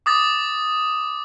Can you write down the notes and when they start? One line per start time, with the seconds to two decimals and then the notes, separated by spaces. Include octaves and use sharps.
0.06 D6 D#6 A6